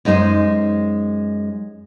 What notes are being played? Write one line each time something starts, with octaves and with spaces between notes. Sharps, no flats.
F#2 G#3 D#4 F#4 C5